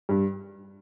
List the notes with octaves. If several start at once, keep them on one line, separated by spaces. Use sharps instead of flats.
G2